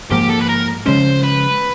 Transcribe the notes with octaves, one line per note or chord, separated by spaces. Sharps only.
G#2 F3 A#3 G4
A4
B4
A#4
C#3 F3 G#3 C#4 C5
B4